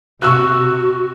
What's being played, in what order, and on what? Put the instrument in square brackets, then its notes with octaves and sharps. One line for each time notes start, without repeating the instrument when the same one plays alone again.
[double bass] C3 [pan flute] F#4 [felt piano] C#6 E6 F#6